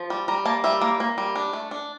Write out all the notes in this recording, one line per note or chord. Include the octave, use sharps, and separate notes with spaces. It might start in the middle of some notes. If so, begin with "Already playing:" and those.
Already playing: F3
G3
G3 A#5
A#3 A5
G3 E5
A#3
A#3
G3
D4
A3
D4